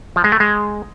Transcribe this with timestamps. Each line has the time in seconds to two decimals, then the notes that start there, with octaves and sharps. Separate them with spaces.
0.16 F3
0.24 G#3
0.32 A3
0.40 G#3